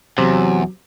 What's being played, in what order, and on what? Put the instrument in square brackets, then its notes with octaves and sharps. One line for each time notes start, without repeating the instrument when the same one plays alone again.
[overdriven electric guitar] E2 [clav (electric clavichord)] C3 [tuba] F#3